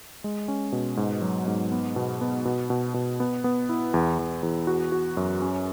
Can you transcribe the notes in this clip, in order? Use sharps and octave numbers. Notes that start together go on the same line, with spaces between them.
G#3
C#4
B2
G#2
F#3
G#2
B3
B2
B3
B2
B2
B2
B3
B3
E4
E2
E2
E2
F#4
F#4
F#2
C#4